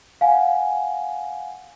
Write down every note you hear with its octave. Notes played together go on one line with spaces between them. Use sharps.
F5 F#5 G#5